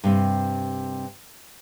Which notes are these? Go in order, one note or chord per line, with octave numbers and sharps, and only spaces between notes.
G2 C3 C4